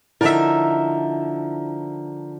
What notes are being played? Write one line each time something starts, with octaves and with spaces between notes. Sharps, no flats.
D3 F3 D#4 E4 A#4 E5